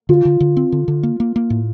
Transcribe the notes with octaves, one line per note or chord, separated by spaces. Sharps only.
D3 F4
D3
D3
C4
D3
D3
A#3
A#3
A#3
A2